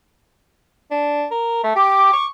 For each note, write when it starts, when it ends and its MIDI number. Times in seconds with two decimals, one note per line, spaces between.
0.91 1.25 62
1.31 1.59 70
1.64 1.71 57
1.76 2.13 67
1.76 2.24 86
2.13 2.26 85